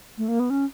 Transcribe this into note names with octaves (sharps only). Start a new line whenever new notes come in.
A3
A#3
B3
C#4